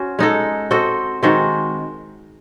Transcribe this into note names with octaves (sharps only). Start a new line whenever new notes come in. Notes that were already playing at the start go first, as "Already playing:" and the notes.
Already playing: C#4 F#4 C5
G#3 D#4 A4
C4 F#4 A4 D#5
D#3 G#3 C4 F#4